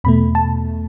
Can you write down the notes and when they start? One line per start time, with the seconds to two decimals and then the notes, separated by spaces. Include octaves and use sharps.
0.04 E2 B2 A3 B5
0.35 A5